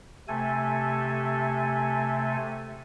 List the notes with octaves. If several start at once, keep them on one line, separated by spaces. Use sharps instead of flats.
C3 A3 A4 G#5